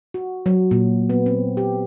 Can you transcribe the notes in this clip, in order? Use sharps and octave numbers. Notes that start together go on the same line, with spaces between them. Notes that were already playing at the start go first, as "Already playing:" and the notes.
F#4
F#3
A#2
B3
C4
G4